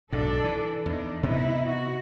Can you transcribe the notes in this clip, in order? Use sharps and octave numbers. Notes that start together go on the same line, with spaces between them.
B1 G#2 D4 A4 D5
E3
E2 D4 D#4
C3 B3 D#4 E4
F#4